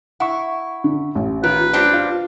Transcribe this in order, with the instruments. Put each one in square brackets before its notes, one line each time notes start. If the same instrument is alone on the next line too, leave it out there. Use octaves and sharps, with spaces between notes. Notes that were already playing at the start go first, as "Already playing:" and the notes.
[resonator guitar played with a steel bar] E4 [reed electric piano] F#5 C#6
[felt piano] D3
A1
[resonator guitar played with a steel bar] D#3 [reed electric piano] F4 [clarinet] B4
[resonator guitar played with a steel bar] G3 C4 D4
[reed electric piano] F4 [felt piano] F5